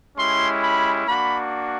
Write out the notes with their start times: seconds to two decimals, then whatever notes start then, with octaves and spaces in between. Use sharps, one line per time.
0.17 G#3 C#4 E4 G4 C6
0.61 B5
1.06 A#3 D4 F#4 B5